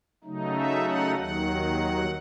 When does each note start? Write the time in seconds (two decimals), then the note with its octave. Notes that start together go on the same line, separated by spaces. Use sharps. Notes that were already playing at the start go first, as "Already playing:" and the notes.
0.24 C#3 F#3 A3 D#4
0.54 E5
0.85 F#5
1.16 D#2 D#3 F#3 F#5